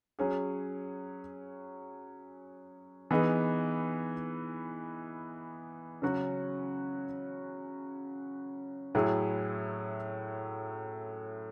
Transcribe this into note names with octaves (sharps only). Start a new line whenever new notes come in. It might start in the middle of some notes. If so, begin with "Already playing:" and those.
F#3 C#4 G#4
E3 B3 D#4 G#4
C#3 F#3 C#4 F#4
A2 F#3 A3 E4 G#4